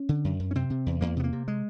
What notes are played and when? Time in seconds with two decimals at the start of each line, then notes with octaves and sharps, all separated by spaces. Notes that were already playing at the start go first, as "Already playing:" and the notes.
Already playing: C#4
0.09 D3
0.24 F#2
0.40 F#2
0.51 C#4
0.55 C3 C4
0.70 C3
0.86 E2
1.01 E2 A#3
1.17 C3 B3
1.24 A#3
1.33 C3
1.48 G#3